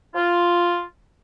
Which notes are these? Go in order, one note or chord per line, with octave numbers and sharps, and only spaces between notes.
F4